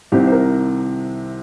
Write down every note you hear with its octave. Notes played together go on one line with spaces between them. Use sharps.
C2 C3 D#3 G4
C5
A#4